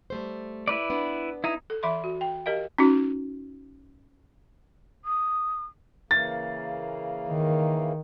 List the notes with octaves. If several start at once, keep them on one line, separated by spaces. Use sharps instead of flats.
G3 A3 C5
E4 B4 D5
B3 D4
D#4 E4
A4
E3 E5 B5 C6
F#4
G5
G4 A#4 D#5 F5
C#4 D#4 F#4
D#6
C#3 E3 A#3 A6
D#3